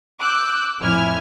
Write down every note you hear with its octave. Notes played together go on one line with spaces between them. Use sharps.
D6 E6 F#6 G6
A1 F2 E4 G#5 F6 G#6